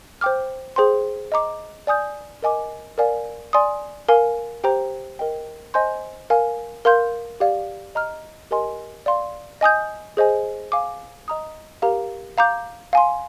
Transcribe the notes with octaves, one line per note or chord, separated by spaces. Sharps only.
C5 G5 D6 F6
G#4 C5 G5 C6
D#5 A#5 D6
D5 G#5 D#6 G6
A#4 D#5 G#5 D6
A#4 D5 F5 G#5
D5 G#5 C6 D#6
A#4 F5 G#5
G4 C5 G5 A#5
A#4 D#5 G5
C5 D#5 G#5 C6 G6
A#4 F5 G#5
A#4 F5 C6 G6
G4 D5 F5
D#5 A#5 F6
G4 A#4 D#5 G#5 C6
D5 F5 C6
D#5 G#5 D#6 G6
G#4 C5 D#5 G#5
F5 G#5 D6
D#5 A#5 D#6
G4 A#4 F5 A#5
F5 A#5 D6 G6
F5 G#5 C6